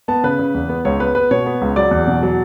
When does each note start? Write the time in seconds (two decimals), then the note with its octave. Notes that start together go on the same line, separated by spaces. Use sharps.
0.08 B3 A5
0.24 C#3 B4
0.39 C#3
0.54 E2
0.69 B3
0.85 C#2 C#5
1.00 B3 B4
1.15 B3 B4
1.31 B2 C#5
1.46 B3
1.61 C#2
1.76 F#3 D5
1.91 E2
2.08 B2
2.23 F#3